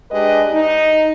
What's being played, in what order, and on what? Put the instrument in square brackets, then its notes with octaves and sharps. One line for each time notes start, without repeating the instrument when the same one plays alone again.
[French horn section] G#3 D4 G4 B4 D#5
D#4